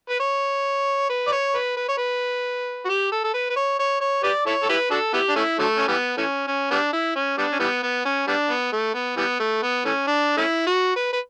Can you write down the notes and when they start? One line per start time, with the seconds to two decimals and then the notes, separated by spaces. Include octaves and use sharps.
0.09 B4
0.20 C#5
1.10 B4
1.27 D5
1.32 C#5
1.55 B4
1.77 B4
1.88 C#5
1.98 B4
2.85 F#4
2.89 G4
3.12 A4
3.24 A4
3.34 B4
3.50 B4
3.56 C#5
3.79 C#5
4.01 C#5
4.23 G4 B4 D5
4.46 E4 A4 C#5
4.62 A4
4.69 E4 G4 B4
4.91 D4 F#4 A4
5.13 B3 E4 G4
5.29 D4
5.36 A3 C#4 E4
5.59 D3 F#3 A3
5.77 C#4
5.88 E3 G3 B3
6.17 E3 A3 C#4
6.47 C#4
6.71 G3 B3 D4
6.93 E4
7.16 C#4
7.38 G3 B3 D4
7.52 C#4
7.59 E3 G3 B3
7.83 B3
8.05 C#4
8.27 G3 B3 D4
8.49 B3
8.72 A3
8.94 B3
9.17 E3 G3 B3
9.39 A3
9.62 B3
9.85 E3 A3 C#4
10.07 D4
10.37 A3 C#4 E4
10.66 F#4
10.96 B4
11.13 B4